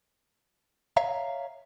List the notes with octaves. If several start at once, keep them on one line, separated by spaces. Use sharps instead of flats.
C#5 E5 F5 A#5